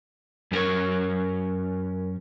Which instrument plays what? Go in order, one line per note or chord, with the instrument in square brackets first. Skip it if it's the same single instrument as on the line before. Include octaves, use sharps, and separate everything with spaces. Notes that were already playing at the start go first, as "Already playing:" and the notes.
[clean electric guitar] F#2 B3 C#4 A#4 C#5